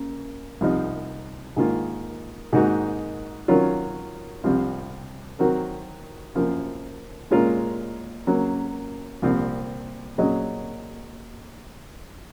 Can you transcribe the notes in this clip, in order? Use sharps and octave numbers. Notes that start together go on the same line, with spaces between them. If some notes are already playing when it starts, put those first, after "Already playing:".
Already playing: C#3 A#3
C2 C3 F3 C4 D#4
G#2 D#3 A#3 F4
G#2 D#3 A#3 D#4 F#4
D#3 F#3 C#4 F4
C2 C3 F3 C4
D#3 F#3 C4 F#4 A#4
F#2 F3 A#3
A#2 G#3 C#4 F4 A#4
C#3 F#3 A#3
C2 A#2 F3 C4
A#2 F#3 C#4 G#4 D#5